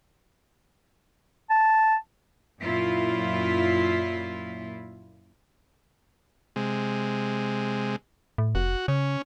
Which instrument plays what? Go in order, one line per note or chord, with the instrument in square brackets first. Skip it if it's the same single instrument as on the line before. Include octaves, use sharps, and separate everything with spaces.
[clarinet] A5
[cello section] F#2 A#2 E4 F4
[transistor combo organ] C3 G#3
[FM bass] A2
[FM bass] F1 [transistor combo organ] F#4
[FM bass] C#3 [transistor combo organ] C#4